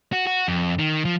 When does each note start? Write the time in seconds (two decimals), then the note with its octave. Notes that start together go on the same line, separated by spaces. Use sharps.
0.13 F#4
0.27 F#4
0.48 F2
0.79 D#3
1.05 F3